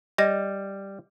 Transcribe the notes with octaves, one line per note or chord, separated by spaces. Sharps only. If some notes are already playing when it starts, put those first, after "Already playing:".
G3 D#5 A#6